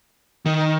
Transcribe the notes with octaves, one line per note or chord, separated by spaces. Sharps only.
D#3